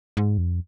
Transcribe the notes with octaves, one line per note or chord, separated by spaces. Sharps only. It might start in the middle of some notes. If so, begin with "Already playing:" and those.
G#2
F2